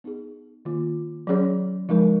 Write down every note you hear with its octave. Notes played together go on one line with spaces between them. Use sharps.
B3 D#4 G#4
D#3 A#3 F4
F#3 C#4 G#4 C#5
F3 G#3 D#4 A#4